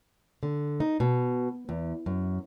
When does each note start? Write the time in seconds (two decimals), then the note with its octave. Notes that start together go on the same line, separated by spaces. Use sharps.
0.43 D3
0.80 D#4
1.00 B2
1.69 E2
2.06 F#2